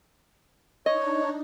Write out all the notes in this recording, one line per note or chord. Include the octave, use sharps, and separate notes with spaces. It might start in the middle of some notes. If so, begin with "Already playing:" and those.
D4 D#4 C#5 D#5